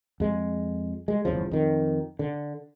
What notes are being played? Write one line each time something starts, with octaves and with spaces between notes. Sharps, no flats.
F2 G#3
G#3
G1 E2 C#3 F3
F2 D#3
D3